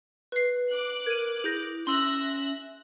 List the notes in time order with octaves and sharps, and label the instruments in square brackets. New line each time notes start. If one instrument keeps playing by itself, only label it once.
[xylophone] B4 C7
[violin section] D6 F#6
[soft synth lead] A#4 [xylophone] G#6 D#7
[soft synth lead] E4 [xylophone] G#4 G6 A#6
[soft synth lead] C#4 [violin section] E5 F#6 A#6 [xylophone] C6 E6